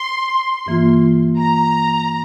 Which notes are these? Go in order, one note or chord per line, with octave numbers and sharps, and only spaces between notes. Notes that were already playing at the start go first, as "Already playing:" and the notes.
Already playing: C6
G2 E3 A#3 F4
A#5